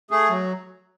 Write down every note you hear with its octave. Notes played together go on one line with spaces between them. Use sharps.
A3 G#4
F#3